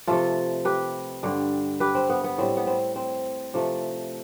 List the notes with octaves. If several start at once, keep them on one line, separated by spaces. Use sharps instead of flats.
C3 F3 A3 F4 A4
G4 B4
G2 D3 G3
G4 B4
C4
B3
B3
A2 G3 C4
B3
C4
C4
C3 F3 A3